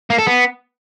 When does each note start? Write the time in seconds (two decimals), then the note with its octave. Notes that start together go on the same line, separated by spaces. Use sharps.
0.10 A#3
0.18 A4
0.27 B3